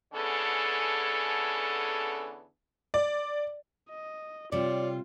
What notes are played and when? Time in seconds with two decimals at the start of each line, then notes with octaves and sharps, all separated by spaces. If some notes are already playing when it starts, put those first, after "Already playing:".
0.13 D3 E3 B3 C#4 G#4 A4
2.94 D5
3.89 D#5
4.52 C3 G3 F4 C#5 D5